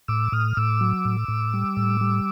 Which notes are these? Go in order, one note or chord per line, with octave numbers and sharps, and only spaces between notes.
A2 D6 E6
A2 D#6 F6
A2 D6 E6
F#3
A2
A2
G3
A2
G3